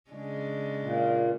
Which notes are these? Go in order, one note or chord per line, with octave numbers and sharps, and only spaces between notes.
C#3 G#3 D4
A#2